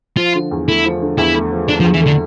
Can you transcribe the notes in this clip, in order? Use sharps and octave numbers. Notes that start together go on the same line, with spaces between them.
F3 F4
D3
E2
A3 E4
F3
D3
E2 E4
A3
F3
D3 D4
F3
E2
E3
D3 A3